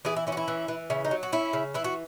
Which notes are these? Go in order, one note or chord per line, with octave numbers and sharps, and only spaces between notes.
E3 E4 G#4
E4
C#4 E4
F#4
E4
E3
E3
C#3 E4
D#4
F#3
F#4
C#4 E4
C#3
E3 E4
F#4